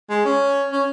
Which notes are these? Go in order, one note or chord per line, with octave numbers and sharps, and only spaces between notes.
G#3
C#4
C#4